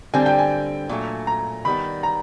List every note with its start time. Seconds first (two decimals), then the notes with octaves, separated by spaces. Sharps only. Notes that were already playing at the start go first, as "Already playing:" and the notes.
0.13 D3 G3 C4 G#5
0.26 G5
0.39 G#5
0.89 A#2 F#3 A3
1.27 A#5
1.65 D#3 G3 B3 B5
2.03 A#5